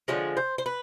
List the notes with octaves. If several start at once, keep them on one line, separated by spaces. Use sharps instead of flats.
D3 F3 G#3 C#5
C5
C5
B4